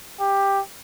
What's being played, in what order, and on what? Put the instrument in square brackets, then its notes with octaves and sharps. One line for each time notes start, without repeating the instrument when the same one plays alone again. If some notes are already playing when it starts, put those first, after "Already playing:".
[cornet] G4